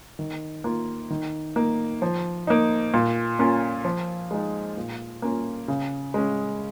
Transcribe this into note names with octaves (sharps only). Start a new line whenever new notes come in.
D#3
A#3 F4
D#3
A#3 D#4
F3
A#3 D#4
A#2
A#3 C#4 F4
F3
G#3 D#4
A#2
A#3 C#4 F4
C#3
G#3 C#4